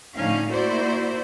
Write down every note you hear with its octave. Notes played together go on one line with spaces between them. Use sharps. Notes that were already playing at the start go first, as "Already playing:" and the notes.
A2 D3 F3 C#4 D#4 F5
A#3 E4 F#4 C5 D5